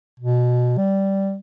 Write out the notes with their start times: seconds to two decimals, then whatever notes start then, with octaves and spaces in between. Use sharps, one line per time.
0.20 B2
0.77 G3